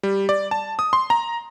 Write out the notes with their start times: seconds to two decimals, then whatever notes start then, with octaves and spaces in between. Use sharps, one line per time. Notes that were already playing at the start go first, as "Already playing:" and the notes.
0.03 G3
0.29 D5
0.51 A5
0.79 D#6
0.93 C6
1.10 A#5